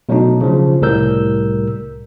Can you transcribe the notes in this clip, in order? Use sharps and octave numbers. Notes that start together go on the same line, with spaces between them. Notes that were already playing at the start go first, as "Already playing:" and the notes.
B2 F#3 A3 D4 D#4
C#3 F3
C2 A2 G3 A#4 E6 G6